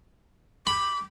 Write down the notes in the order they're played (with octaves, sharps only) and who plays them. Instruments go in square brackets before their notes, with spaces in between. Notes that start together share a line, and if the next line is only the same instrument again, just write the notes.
[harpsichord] B5 [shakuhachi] D6